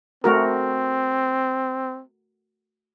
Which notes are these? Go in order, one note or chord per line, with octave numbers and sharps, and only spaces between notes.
A3 C4 F#4 A#4